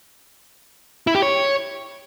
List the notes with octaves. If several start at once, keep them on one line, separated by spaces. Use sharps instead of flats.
E4
G4
C#5